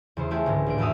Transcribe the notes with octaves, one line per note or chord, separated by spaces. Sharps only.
E2 C#3 C5
A3 E4 F4 G4 G#4
C#2 G#2 D3
A1 D4 D7
G#1 E2 F#4 E5 F5 D#6